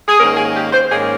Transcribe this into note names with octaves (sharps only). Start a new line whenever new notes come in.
G#4
G#2 D#3 A#3 C#4 A#4
G#4
G4
C5
G#2 D#3 A#3 C#4 G#4